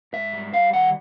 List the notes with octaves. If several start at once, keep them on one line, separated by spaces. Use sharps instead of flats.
G#2 E5
G3
G3 F5
D#3 F#5